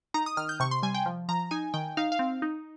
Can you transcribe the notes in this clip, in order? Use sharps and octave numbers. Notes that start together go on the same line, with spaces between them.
D#4 A#5
D#6
D#3 F6
G6
C3 C#6
C6
G3 G#5
G5
F3
F3 A#5
D#4 G#5
D#3 G5
D#4 F5
F5
C4
D#4